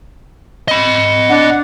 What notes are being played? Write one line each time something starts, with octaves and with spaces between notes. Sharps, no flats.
D#5 B5
D4 F#5